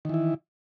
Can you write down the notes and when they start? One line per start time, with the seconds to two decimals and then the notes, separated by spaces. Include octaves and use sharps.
0.05 D#3
0.09 E3
0.14 E4